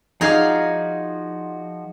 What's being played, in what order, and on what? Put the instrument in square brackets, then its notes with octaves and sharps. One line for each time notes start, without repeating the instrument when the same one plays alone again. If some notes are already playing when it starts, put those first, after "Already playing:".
[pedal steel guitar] F3 F#4 D5 [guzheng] D#4 G#4 F5